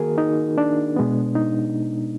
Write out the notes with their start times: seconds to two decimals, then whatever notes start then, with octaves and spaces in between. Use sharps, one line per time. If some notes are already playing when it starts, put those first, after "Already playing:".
Already playing: D#3 A#3 F#4 G#4 A#4
0.18 D#4
0.58 D4
0.96 B2 G#3 B3
1.35 D#4